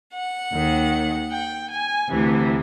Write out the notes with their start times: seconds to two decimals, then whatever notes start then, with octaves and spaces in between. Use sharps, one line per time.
0.13 F#5
0.53 D#2 D#3
1.31 G5
1.70 G#5
2.10 D2 C3 E3